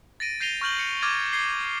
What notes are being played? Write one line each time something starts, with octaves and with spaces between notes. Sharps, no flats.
A6 A#6 D7 D#7
G6 A#6 C7 D#7 F7 G7
C#6 F6 G6 F#7 G7
C#7
D6 F6 G#6 A6 D#7 F#7
G#6 C7 G7